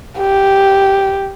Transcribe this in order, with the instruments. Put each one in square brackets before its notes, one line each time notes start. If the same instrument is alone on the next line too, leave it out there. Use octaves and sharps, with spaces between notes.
[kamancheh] G4